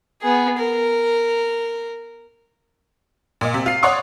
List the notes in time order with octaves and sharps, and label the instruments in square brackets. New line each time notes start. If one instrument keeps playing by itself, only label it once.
[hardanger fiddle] B3 G#4
A#4
[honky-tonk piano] A#2 D#5
C3
F4 C7
C#5 D5 F#5 C6 C#6 D#6